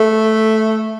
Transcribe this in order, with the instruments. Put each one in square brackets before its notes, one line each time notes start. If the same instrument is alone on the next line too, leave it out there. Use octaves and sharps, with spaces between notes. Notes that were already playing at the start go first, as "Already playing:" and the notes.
Already playing: [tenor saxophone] A3